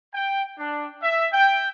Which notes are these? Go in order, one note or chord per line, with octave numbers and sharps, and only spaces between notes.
G5
D4
E5
G5